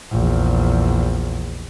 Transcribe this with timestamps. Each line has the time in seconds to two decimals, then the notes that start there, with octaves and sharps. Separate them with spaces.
0.12 A#1 E2